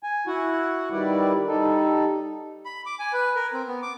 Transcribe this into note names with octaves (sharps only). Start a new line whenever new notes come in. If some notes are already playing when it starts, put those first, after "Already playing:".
G#5
E4 F#4 F#5
D#3 G3 E4 B4 D5
G3 D#4 A4
B5
D6
G#5
B4
A#4
C4
B3
D6